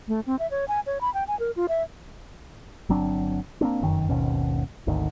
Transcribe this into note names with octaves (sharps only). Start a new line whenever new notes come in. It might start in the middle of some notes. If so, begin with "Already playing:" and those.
A3
C4
E5
C#5
G#5
C#5
B5
G5
G#5
A#4
F4
E5
G1 F#3 C4 D4
A#3 C4 D4
F1 F#2 D#3
G#1 D#2 B2 C#4
G#1 D2 D3 D#3